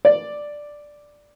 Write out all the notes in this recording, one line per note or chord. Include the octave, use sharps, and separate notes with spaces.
D5